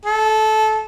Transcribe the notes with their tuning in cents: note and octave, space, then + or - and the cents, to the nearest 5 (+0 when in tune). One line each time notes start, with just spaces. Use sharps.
A4 -20